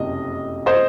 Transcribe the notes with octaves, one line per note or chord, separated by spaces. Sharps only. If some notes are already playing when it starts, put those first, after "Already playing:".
Already playing: F#1 F2 C3 C#4 D#5
C5 D#5